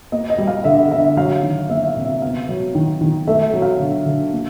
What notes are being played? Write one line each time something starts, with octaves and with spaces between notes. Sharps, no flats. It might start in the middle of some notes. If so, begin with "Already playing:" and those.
A#3 D#5
D#5
G3
F5
D3 E5
D3 E5
F#3 F5
D#3
A#3 E5
F5
C3
E5
B3 F5
F#3
D#3
D#3
A3 E5
F#3
F5
D3
D3
A#3